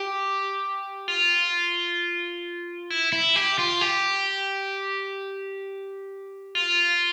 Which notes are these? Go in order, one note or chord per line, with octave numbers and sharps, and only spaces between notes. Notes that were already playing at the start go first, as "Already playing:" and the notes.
Already playing: G4
F4
E4
E4
G4
F4
G4
F4